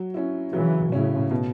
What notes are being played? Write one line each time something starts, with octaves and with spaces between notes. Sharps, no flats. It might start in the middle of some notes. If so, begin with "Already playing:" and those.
Already playing: F#3
C#4 E4
C#3 E3 F#3
A2 C#3 C#4 E4
B2